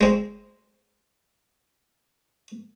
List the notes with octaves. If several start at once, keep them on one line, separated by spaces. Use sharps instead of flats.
G#3 C4